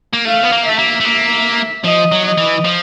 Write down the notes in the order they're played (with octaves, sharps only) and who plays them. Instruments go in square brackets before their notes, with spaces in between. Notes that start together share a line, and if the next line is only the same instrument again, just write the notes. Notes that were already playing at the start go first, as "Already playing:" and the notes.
[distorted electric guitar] A#3
[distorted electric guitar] A3 [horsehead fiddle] F5
[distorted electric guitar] B3
A#3
[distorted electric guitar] A3 [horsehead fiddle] E5
[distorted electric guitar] A#3
A3
A#3
[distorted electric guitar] F3 [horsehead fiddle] D#5
[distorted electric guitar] F#3
[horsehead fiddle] D#5
[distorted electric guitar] E3
F3